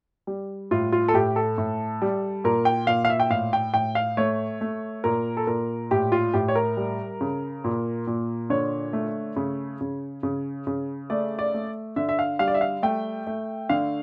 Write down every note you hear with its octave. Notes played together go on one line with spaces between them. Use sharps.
G3
A2 F4
F4
A4
A2 G4
A4
A2
G3
A#2 A#4
G5
A#2 F5
F5
E5
G5
A2 F5
G5
A2 G5
F5
A3 C#5
A3
A#2 A#4
A4
A#2 A#4
A2 G4
F4
A2 G4
C#5
A#4
G3
C#3
A#2
A#2
D3 C#5
A3
C#3
C#3
C#3
C#3
A3 D5
D5
A3
D3 E5
E5
F5
G3 F5
D5
E5
F5
A3 G5
A3
D3 F5